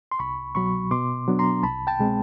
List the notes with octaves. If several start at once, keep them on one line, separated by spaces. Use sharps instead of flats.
C6
C2 B5 C#6
B2 F#3 B5 C#6
B2 C6 D6
F#3 B3 D4
A#5 C6
C2 A5 B5
G5 A5
B2 G#3 C4